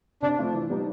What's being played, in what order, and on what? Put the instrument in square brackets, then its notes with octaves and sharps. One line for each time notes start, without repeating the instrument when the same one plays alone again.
[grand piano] C3 [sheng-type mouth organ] D4
[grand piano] F3 A3 C4 F4
E3
G3 B3 D#4